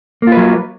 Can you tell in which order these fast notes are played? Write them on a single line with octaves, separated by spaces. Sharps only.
A#3 F4 B4 F#3